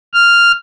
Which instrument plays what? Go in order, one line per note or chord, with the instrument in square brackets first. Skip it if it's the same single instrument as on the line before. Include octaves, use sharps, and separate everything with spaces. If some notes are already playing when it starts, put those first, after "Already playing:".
[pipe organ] F6